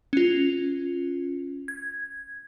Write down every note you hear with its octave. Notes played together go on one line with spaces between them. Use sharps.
C#4 F4
G#6